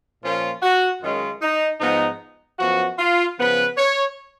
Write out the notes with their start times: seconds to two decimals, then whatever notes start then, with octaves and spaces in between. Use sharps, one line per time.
0.24 A#2 F3 A#3 C#4 F4
0.63 F#4
1.02 F#2 D#3 G#3 C#4 F4
1.42 D#4
1.81 G#2 F3 B3 D#4
2.59 F#2 F3 B3 F#4
2.99 F4
3.39 C#3 F3 B3 B4
3.77 C#5